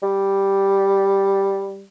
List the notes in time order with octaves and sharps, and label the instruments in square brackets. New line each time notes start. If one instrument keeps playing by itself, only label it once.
[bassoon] G3